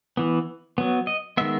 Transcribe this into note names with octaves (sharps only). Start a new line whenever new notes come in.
E3 B3
F#3 B3
D#5
D#3 G#3 B3 E5